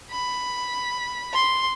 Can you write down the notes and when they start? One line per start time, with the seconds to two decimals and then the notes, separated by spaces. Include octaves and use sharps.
0.11 B5
1.34 C6